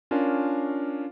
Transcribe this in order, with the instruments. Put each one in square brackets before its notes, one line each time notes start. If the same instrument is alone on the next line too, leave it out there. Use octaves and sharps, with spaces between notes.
[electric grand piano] C#4 D4 F4 A#4 F5